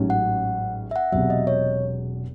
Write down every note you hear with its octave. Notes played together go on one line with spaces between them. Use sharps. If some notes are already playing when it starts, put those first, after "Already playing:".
Already playing: A1 G#2 F#3 C#4
F#5
E5
F#5
E1 E2 C3 F#3 E5
D#5
C#5